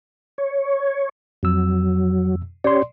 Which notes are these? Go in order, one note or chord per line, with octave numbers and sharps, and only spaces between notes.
C#5
F2 F#3 E6
C#4 G4 C#5 D5 C6